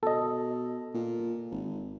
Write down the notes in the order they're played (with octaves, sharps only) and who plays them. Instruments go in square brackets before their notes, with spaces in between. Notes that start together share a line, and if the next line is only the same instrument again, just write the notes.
[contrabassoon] B2 [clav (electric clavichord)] A4 D#5
[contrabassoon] A#2
G#1